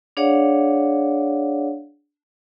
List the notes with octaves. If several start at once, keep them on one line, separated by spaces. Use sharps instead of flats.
D4 G#4 C#5 D5 F5 F#5